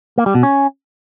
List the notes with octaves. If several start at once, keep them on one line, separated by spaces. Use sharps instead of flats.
A#3
G3
B2
C#4